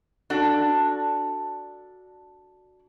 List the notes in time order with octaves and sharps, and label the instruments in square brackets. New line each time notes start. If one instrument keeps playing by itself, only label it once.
[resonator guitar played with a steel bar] D4 F#4 A4